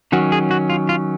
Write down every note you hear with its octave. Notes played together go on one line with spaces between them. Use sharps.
D#3 F#3 C#4 F#4
G#4
F#4
F4
F4